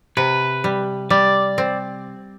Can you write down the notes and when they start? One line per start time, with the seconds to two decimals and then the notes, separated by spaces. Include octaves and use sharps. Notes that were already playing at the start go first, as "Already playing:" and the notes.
0.17 C3 B4
0.64 G3
1.10 G3 D5
1.58 C4